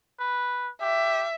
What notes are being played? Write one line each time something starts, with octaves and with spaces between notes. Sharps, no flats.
B4
G4 E5